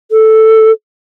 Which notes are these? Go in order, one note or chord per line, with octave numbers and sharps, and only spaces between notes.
A4